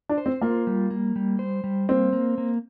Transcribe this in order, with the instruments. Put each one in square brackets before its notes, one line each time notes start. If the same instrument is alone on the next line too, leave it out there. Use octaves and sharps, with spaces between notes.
[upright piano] D4
[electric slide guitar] C5
[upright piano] C4
[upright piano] A#3 [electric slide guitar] F4
[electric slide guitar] G3
A#3
G3
C5
G3
[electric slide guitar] A#3 [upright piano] C4
[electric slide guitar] A#3
A#3